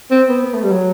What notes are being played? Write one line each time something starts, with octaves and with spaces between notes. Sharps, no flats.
C4
B3
B3
A3
G3
F#3